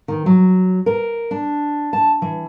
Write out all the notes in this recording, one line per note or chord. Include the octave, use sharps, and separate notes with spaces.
D#3
F#3
A#4
D4
A5
E3